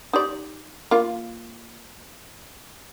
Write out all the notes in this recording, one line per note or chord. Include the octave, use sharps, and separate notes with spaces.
D#4 G4 D5
A#3 F4